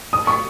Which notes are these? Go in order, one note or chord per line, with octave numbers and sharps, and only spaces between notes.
D#6
C#6